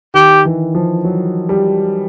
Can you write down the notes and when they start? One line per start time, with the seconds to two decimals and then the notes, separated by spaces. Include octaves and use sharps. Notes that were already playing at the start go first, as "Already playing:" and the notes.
0.14 D#3 G4
0.45 E3
0.75 F3
1.05 F#3
1.49 G3